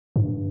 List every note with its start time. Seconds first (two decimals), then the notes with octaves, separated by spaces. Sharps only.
0.16 G2